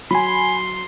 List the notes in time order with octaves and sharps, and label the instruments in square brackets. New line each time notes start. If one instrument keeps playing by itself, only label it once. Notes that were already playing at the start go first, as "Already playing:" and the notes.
[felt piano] F#3 [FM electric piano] G#5 B5 [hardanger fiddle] C6